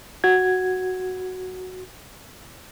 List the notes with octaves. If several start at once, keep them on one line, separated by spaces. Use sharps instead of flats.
F#4 G#6